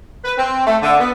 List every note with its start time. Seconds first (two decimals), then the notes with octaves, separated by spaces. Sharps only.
0.25 B4
0.37 C4
0.66 A3
0.82 D3
1.00 B3